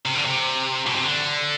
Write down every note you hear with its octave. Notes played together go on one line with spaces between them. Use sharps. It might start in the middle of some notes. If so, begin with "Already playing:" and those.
C3
D3
C3
B2
C3
D3